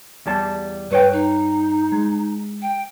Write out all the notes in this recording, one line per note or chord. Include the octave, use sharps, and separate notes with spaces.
E2 G3 A5
G2 B4 C#5 G5
D#4
G#3
G5